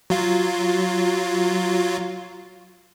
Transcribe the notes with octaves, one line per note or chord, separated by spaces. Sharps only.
F#3 F4